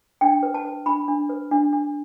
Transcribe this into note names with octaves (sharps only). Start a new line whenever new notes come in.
D4 G5
B4
A5
B4
D4 B5
D4
B4
D4
D4